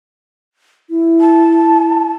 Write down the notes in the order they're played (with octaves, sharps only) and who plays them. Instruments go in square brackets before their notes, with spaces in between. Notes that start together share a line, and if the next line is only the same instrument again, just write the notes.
[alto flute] E4
[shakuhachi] A5